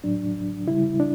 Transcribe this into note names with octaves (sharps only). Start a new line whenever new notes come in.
A2 F#3 D4
C#3 G3 E4
D4